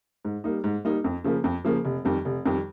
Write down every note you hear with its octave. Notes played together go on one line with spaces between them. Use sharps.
G#2
G3 A#3 D#4
G#2
G3 A#3 D#4
F2
C#3 F3 A#3
F2
C#3 F3 A#3
F1
F2 D#3 G3
F1
F2 D#3 G3